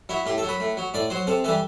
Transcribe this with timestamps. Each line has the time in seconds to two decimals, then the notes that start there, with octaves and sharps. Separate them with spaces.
0.09 F#3 E4
0.26 A2 G4
0.38 A4
0.43 F#3
0.48 B4
0.60 A2
0.77 F#3
0.94 A2 D5
1.10 F#3 C5
1.27 C3 A4
1.44 E3 G3 A4